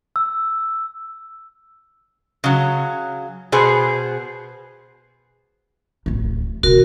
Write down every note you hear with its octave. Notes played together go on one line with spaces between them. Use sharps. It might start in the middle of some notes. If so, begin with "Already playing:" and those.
E6
C#3 F#3
B2 B3 G#4 C5
D1 A1
B2 D#3 F#4 A#4